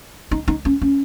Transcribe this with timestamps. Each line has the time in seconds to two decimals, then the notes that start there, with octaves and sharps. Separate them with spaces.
0.31 D#4
0.48 D#4
0.65 C#4
0.82 C#4